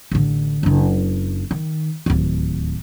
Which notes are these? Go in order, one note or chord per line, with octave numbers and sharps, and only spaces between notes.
A1 D3
F#1 D4
D#3
D1 D#2